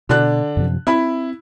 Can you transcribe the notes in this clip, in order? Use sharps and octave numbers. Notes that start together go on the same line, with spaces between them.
B2 D3 D4 F#6
F#2 C3 F3
C4 E4 B5